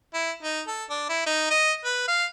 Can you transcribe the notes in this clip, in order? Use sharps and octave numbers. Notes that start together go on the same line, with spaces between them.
E4
D#4
A4
D4
E4
D#4
D#5
B4
F5